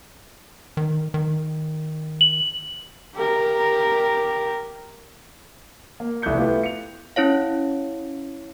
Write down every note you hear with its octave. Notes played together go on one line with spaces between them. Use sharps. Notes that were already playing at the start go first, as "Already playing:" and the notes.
D#3
D#3
F#7
G4 A#4
A#3
F1 C2 A4 F#6 G6 C#7
A3 B3 E4 F4 G4
C#7 F7
C#4 E4 C#5 F5